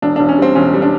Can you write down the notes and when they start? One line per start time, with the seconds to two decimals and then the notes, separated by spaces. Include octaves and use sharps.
0.02 E1 D4
0.16 E1 D4
0.29 C#4
0.38 G3 C4
0.55 E1 C#4
0.74 G3
0.82 D4